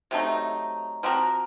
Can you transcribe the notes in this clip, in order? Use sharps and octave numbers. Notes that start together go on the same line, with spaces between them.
C3 F#3 A3 D#4
F3 C4 F#4 A#4